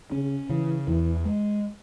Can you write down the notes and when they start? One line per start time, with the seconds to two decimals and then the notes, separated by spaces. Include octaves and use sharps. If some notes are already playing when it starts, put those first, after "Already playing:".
0.11 C#3 C#4
0.49 C#3 E3
0.87 E2 E3
1.25 G#3